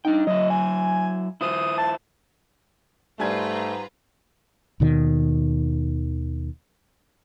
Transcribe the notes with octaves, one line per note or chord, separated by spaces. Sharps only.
D4 D#4 G5
F#3 E4 D#5
G#5
E4 F4 C5 D#6
A5
G#2 G3 A3 F4 B4 G#5 A#5 G#6
D#2 B2 D#3